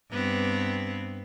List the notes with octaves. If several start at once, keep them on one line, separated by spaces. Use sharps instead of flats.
G2 B3 C4